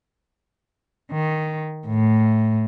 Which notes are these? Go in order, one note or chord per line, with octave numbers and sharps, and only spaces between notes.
D#3
A2